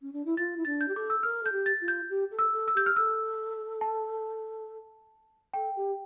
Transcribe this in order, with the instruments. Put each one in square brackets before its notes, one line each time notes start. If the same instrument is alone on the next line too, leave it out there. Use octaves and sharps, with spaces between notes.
[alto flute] C#4
D4
E4
[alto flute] F4 [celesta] A6
[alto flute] E4
[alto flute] D4 [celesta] A6
[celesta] G6
[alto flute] G4
[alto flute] A4 [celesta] D6
[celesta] E6
[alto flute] A#4 [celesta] F6
[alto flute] A4 [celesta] G6
[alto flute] G4
[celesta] A6
[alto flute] F4
[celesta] G6
[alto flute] G4
A4
[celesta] E6
[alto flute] A4
[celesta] E6
[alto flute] G4 [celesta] G6
[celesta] F6
[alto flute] A4 [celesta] E6
[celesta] A5
[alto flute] A4 [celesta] G5
[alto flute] G4